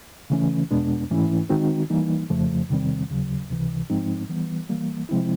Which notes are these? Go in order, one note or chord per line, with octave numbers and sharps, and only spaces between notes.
C#3 E3 A3 C#4
E2 B2 G#3 B3 D4
G#2 E3 A3 C#4 E4
D#3 G#3 C4 D#4 F#4
E3 G3 A#3 D#4
F2 C#3 F3 A3
E2 C3 D#3 G3 C4
D#2 C#3 F#3
C#2 C3 E3
G#2 F3 G#3 C4 D#4
E3 G3 B3
E3 G3 A#3
C3 F3 G#3 C4 E4